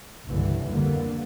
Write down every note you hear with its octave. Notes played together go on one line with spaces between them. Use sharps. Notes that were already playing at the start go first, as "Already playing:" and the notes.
F#1 C2 G2 D3 E3
F2 D3 G3 A#3 B3